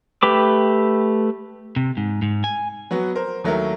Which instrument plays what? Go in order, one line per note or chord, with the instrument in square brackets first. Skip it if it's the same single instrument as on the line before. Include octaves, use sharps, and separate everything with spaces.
[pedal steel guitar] A3 G4 B4 D6
[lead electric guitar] C3
G#2
G#2
G#5
[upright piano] F#3 B3 F#4
A#4 C5
D#2 F#3 A3 E4 A#4